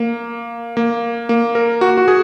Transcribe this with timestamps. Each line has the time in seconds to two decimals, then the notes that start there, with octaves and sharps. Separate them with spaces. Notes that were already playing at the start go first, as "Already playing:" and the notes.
Already playing: A#3
0.77 A#3
1.29 A#3
1.55 A#4
1.81 F#4
1.97 F#4
2.08 G#4